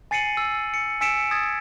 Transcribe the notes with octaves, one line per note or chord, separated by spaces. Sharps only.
G#5 A6 C7 C#7 D#7 F#7
E6
C#7
G#5 E6 B6 C#7 D7 E7
D#6 G#6 A6